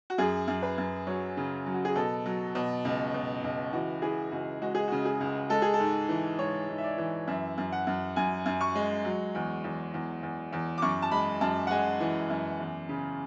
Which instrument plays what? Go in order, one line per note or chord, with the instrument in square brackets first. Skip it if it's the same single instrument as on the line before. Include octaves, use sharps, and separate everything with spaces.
[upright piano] F#4
F#2 G#4
F#2
B4
F#2
F#3 C#5
C#3
F#3
F#4
G#4
B2 A4
F#3
B2
C#2
B2
C#2
E3 F#4
E3 G#4
C#2 F#4
G#3 F#4
G#4
F#4
C#3
G#4
C#2
G#3 A4
G#4
A4
G#2
E3
G#2 C#5
G#2
E5
D5
E3
F#2 E5
F#2
F#5
F#2
F#2 G#5
F#2
C#6
G#3
F#3
E2
E2
E2
E2
E2
D6
F#2 C#6
A5
G#3 B5
F#2 A5
F#5
G#3 G#5
E3
F#2
E2
C#3